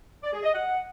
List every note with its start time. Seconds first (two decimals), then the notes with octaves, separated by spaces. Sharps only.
0.23 D5
0.33 G#4
0.43 D#5
0.53 F#5